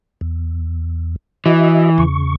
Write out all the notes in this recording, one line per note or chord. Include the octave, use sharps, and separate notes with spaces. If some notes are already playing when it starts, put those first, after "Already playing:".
E2
E3 F#4 D#5 E5
E2 C#3 C#6